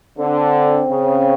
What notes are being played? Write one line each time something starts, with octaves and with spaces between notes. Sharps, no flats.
D3 C4
C#3